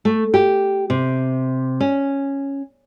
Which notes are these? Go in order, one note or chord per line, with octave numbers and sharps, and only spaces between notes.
A3
G4
C3
C#4